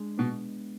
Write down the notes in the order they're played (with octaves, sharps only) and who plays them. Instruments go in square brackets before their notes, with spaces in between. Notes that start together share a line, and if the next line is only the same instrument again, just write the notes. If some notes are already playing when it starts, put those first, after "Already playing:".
Already playing: [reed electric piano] G#3 D4
[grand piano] B2 [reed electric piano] B3